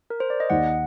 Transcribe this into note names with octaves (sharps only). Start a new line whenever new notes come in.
A#4
C5
D5
D#5
D#2 F#5